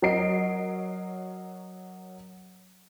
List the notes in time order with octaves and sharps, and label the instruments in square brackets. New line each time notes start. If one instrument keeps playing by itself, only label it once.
[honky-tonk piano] F#3 A#4 D#5 C7 D7